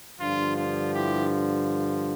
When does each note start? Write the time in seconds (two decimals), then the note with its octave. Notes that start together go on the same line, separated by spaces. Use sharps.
0.20 G2 D3 F3 D4 F4
0.57 D4 F4
0.93 E4 G4